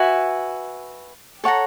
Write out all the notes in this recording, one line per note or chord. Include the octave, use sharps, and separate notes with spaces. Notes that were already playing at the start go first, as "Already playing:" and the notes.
Already playing: F#4 B4 E5 G#5
A4 C#5 F#5 A#5